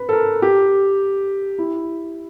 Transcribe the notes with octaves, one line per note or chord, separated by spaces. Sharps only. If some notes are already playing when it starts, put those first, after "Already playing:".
Already playing: B4
A4
A#4
G4
E4